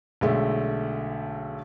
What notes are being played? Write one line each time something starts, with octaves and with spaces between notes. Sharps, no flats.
B1 D3 G#3 A3